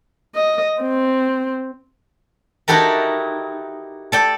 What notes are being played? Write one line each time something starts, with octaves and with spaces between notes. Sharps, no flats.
D#5
C4
D#4 E4 F#4 G4 A4 A#4
A4 D5 G5